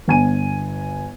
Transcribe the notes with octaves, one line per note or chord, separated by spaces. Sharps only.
G1 G#5 D#7